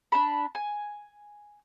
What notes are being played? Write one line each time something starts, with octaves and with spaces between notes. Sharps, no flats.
D4 A5 B5
G#5